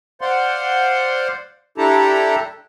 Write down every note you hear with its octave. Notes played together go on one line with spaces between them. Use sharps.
C5 D5 F5 F#5 C6
D4 E4 G4 A4 A5 A#5